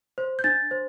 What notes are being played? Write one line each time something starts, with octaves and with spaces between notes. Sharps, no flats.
C5
G6
D4 A6
C5